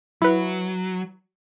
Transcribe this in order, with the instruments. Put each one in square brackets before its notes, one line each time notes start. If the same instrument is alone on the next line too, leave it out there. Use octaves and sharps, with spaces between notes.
[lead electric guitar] F#3 [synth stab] E4 B4